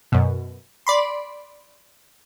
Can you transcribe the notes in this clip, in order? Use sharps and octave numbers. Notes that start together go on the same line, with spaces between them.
F#2 B2
D5 B5 C6